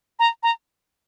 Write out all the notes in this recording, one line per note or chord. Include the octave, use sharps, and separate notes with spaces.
A#5
A#5